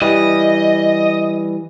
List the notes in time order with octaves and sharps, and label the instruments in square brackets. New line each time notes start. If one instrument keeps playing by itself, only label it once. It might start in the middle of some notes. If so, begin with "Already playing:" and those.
[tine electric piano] E3 G3 [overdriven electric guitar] D#5